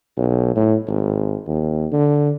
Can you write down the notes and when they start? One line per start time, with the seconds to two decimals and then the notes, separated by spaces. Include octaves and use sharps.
0.17 B1
0.56 A2
0.88 G#1
1.48 D#2
1.92 D3